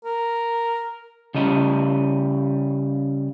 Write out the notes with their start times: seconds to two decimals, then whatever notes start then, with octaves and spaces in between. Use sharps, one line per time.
0.05 A#4
1.34 C#3 G3 D#5